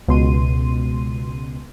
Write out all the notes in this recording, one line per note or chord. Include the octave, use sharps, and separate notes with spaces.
C#2 B2 C6 D#7